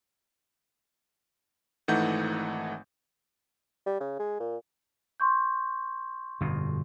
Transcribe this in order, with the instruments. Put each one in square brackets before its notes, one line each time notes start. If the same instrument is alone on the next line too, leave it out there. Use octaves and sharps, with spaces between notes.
[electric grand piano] G#1 E3 A3 D#4 F#5 G6
[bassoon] G3
C#3
G#3
A#2
[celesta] C6 C#6 G6
[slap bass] G1 F2 B2